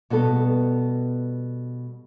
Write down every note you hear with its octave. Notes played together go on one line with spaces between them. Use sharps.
B2 G3 B3 A4